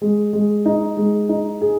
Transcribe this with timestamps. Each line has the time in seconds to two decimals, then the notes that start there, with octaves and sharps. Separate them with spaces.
0.02 G#3
0.33 G#3
0.66 D#4
0.97 G#3
1.29 D#4
1.62 G#4